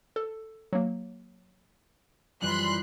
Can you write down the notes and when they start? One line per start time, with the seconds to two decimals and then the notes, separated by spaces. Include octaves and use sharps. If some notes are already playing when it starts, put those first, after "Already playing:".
0.16 A4
0.73 F#3 A#3
2.42 F#2 E3 F3 G3 B5 C6 F#6